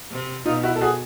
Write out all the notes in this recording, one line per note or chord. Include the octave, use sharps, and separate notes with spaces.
C3
B2 D#4 F4
E4 F#4
A4
F#4 G#4